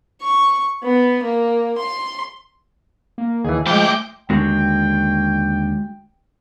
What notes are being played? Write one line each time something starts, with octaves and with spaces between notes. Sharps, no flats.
C#6
B3
A#3
C6
A#3
D#2 E3 G#4
F3 G#3 A3 E5 G5 C6 D6
D#2 D3 G#3 F#4 G5